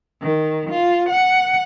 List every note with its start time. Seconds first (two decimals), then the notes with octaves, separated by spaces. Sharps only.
0.22 D#3
0.71 F4
1.10 F#5